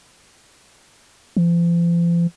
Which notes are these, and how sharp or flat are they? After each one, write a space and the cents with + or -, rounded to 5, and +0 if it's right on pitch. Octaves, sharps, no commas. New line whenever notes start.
F3 -40